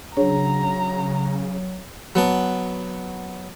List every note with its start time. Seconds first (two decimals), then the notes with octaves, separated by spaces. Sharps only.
0.17 C#3 F#3 D4 G#4 C#5 A#5
2.15 F#3 B3 A5